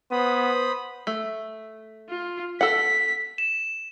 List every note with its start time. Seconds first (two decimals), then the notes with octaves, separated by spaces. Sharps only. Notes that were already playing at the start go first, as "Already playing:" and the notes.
0.12 B3 C5 B5 D#6
1.07 A3
2.09 F4
2.61 A4 F#5 B6
3.38 E7